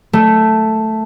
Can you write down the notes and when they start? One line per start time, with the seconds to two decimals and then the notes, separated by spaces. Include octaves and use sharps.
0.13 A3